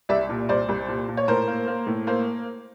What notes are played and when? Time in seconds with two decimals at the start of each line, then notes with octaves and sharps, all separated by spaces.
0.09 C2 D5 E5
0.29 A#2
0.49 C2 C5 D5
0.69 C2
0.88 A#2
1.08 A#2
1.17 C#5
1.28 A2 A#4 C5
1.48 A#3
1.68 A#3
1.87 A2
2.07 A#3 C5